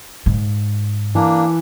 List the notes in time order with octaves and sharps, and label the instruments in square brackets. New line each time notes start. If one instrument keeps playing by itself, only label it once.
[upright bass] G#2
[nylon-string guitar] E3 [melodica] A#3 D4